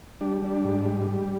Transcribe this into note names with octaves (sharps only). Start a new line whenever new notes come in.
G3 D4
G3 D4
G#2
G3
G3